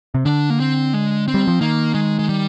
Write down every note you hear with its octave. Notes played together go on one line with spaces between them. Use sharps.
C3
D3 D4
A#3
C4
G#3
C4
G3
F3
D#3 A#3
G#3
G#3
G3